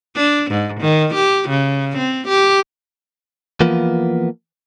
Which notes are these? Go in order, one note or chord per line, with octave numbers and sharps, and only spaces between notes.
D4
G#2
D#3
G4
C#3
C4
G4
E3 F3 A#3 B3 F4